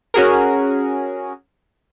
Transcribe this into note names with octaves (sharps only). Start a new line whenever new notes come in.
C#4 F#4 G#4 A#4